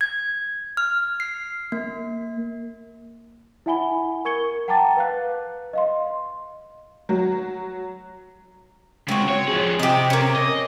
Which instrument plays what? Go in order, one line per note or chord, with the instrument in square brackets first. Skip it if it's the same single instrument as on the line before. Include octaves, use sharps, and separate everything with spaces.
[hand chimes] G#6
F6
C7
A#3
[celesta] E4 E5 F#5 G#5 B5 G7
A#4 C#6 G#6 C#7 G7
F#5 G5 A5 A#5 D6 A6
B4 F5 F#6
D#5 F5 C6
[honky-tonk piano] F#3 F#4
[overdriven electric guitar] C#3 G#3 [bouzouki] C4 F#4
[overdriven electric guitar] C#5
F3 G#4
[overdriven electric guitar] C3 [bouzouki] G4 D#5
[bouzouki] A#3 C#4
[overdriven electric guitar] D#5